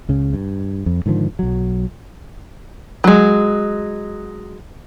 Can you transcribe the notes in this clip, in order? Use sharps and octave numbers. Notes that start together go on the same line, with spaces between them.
C#2 C#3 C#4
G2
F2
G#2 D3 D#3 F3
B1 F#3
F#3 G#3